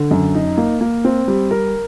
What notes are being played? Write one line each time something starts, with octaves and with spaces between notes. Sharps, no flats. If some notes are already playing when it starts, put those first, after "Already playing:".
Already playing: D3
F#2
D#4
A#3
A#3
C4
G3
A#4